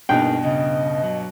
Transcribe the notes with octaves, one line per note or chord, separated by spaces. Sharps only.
G2 B2 A#3 D#4 G#4 G5
C#3 D#5
F#3